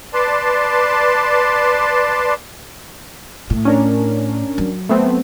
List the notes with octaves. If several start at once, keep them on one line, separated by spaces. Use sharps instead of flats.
B4 D5 A5 C6
A2
C#4 D4 A#4
F#3
A3 B3 C4